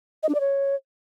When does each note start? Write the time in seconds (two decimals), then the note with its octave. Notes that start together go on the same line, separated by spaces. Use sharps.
0.23 D#5
0.29 D4
0.35 D5
0.40 C#5